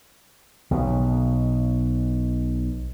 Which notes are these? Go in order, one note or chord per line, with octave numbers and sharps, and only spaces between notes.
B1 B2